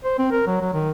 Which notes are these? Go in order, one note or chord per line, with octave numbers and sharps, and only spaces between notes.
C5
C4
A#4
F#3
F#3
D#3